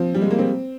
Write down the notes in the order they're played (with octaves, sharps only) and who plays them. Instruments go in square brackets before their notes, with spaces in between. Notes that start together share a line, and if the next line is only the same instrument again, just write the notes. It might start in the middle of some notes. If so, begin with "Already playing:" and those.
Already playing: [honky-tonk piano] F3 C4
G3
G#3
A#3
C4